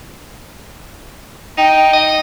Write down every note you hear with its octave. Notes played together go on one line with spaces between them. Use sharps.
D#4 G5
D#5